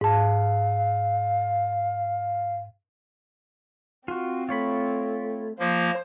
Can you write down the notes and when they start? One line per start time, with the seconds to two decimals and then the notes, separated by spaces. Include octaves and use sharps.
0.01 G#2 F5 A5
4.08 C4 F4 F#4
4.49 A3 F4 C#5 B5
5.59 F3 A#3 F4 C5